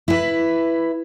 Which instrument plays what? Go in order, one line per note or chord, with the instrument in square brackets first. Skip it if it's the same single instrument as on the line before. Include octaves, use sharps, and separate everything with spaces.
[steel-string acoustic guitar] E4 B4